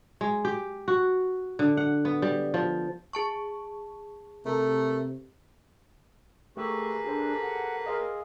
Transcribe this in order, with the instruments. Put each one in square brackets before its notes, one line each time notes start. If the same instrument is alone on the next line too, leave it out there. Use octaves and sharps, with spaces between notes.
[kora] G#3
G4
F#4
D3
F#5
B3
G3
F3
[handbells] G#4 A5 C#6
[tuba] C3 [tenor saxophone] A3 [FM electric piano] A4 A#4
[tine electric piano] A3 G4 E6 [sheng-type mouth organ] A#3 B4 [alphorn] G#4 [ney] C#6
[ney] D4 [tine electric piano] G4 A4 C5
[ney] F#5
[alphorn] G#4 [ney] A#4 [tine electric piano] D#5 F5 C6